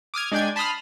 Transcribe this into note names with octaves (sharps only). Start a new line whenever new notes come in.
D6 D#6 F6 G#6
G#3 D4 D5 G5 G#5 G#6
A5 B5 C6 D#6 F6